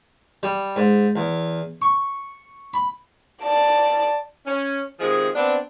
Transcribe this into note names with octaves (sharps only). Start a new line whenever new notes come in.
G3
G#2
E2
C#6
B5
D5 A5
C#4
C3 D#3 F3 G#3 G#4
B3 C4 D4